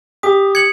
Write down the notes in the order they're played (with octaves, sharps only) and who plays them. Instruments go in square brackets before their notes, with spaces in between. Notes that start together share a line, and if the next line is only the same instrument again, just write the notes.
[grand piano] G4 [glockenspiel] D#6
[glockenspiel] G#6 C#7 F#7